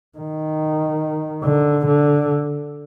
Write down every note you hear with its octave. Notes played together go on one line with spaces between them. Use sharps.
D#3
D3
D3